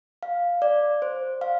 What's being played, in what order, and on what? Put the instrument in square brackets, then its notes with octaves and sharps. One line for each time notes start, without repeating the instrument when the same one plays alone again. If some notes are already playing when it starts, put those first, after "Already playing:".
[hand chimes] F5
D5
C5
F5